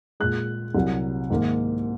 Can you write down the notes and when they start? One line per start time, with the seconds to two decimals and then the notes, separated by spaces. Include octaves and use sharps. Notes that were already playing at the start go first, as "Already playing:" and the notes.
0.20 A#2 G#3 F#6
0.75 C2 C3 F#3
1.30 G#2 D#3 A#3